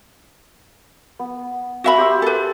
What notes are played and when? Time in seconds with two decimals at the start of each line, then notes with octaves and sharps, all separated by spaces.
1.19 B3
1.84 F#4 E5 B5
1.98 G4 C6 E6
2.22 A4 B4